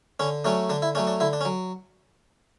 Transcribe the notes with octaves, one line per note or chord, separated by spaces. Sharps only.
D3 C#4
F#3 A3 C#4 D4
D3 D4
E4
F#3 A3 C#4 D4
D4
D3 E4
D4
C#4
F#3